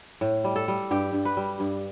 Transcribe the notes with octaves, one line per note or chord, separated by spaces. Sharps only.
A2
G3
A4
G3
G2 G4
G2
B4
G3
G2